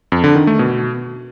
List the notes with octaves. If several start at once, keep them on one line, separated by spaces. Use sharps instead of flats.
F2
D3
D#3
A3
B2